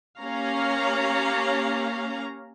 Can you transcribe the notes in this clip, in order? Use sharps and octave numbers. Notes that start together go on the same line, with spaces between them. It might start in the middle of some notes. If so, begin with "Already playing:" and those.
A#3 C#4 G4 C#5 F5 A#5